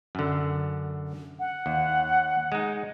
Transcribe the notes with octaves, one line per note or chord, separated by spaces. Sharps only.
F#2 D3
F#5
D#2
G#3 D#4